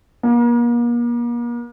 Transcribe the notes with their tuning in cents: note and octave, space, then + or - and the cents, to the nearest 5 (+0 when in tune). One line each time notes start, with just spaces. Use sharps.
A#3 +40